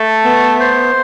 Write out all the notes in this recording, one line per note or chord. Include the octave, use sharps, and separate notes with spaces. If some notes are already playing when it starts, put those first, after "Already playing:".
Already playing: A3 A4
B3
C5